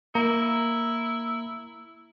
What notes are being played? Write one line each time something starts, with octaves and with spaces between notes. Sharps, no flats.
A#3 E4 A#5